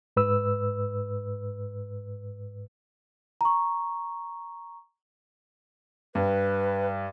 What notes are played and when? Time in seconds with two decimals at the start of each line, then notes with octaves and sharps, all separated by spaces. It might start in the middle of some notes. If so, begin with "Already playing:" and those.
0.17 G#2 B4 E6
3.41 A#5 C#6
6.15 G2 B4